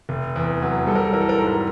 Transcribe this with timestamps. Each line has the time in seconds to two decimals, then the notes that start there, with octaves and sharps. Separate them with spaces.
0.09 F1
0.36 E2
0.62 F#3
0.87 G3 A4
0.95 A#4
1.04 A4
1.13 E3 A#4
1.21 A4
1.29 A#4
1.38 G#2 A4
1.47 A#4
1.55 A4